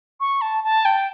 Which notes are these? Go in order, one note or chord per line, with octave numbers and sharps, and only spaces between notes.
C#6
A5
A5
G5